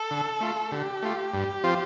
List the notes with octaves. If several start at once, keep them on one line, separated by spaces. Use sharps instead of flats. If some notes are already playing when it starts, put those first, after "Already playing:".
Already playing: A4
D3
A3 F4
D3 G4
A3 F4
G2
F3 C4 F4